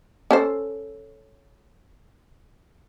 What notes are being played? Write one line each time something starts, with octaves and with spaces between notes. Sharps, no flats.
C#4 A4 C5